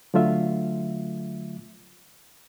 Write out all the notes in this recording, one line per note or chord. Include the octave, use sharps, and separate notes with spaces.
D3 F#3 A3 F4 E5